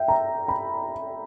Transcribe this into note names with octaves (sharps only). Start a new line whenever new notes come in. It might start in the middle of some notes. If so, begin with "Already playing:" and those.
Already playing: E5 G5
A#5
B5